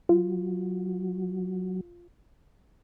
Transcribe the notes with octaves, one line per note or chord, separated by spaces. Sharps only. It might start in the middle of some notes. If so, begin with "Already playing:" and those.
F#3 F4